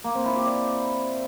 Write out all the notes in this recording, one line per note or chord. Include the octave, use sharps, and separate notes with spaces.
A#3
C4
E4
G4
D5